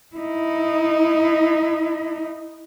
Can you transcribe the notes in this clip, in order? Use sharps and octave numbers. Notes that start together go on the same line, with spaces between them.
D#4 E4